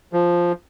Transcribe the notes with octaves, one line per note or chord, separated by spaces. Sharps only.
F3